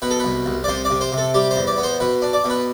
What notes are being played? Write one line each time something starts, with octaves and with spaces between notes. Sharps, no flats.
B2 B4
A4
C2 B4
C2
D5
C3 C5
D5
C3
C5
C3
A4
G3 G4
C5
E2
D5
B3
C5
B2 B4
D4
D5
B2
B4